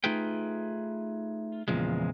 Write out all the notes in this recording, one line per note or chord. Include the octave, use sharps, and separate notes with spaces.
A3 D#4 F4 G#4 B4 G5
E2 A#2 C#3 F3 G#3